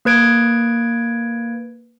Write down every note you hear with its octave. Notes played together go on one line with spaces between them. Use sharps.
A#3 B4 G#6 D7